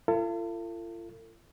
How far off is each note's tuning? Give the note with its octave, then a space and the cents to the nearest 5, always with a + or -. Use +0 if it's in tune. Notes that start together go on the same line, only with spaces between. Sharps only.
F4 -45 A4 +35